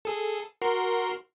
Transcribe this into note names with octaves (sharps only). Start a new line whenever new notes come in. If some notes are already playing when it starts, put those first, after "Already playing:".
G#4 A4
F#4 A#4 C6